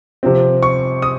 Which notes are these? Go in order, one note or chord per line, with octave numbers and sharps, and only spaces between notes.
C3 F3 C4
C#6
D#6